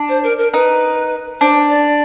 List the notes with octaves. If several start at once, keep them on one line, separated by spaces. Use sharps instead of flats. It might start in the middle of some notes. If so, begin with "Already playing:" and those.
Already playing: D4
C5
A#4
A#4
D#4 B4
D4 C5
D5